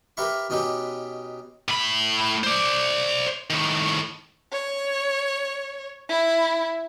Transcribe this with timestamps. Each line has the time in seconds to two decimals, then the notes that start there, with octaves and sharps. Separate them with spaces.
0.17 G4 A#4 B4 E5 B5 C#6
0.50 B2 C#4 D#4 G4 B4
1.68 A2 B5
2.44 C5 D5
3.50 A2 D#3
4.52 C#5
6.09 E4